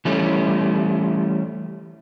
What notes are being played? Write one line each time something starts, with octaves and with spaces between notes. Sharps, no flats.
E3 G3 A3 C#4